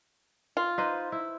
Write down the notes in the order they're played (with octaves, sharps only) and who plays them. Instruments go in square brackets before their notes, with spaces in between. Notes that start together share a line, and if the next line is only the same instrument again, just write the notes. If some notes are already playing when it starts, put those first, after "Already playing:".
[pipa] F4
[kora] D#4 B4 C5
E4